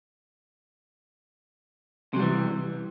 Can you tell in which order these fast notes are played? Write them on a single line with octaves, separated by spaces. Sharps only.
C3 F#3 G3 E3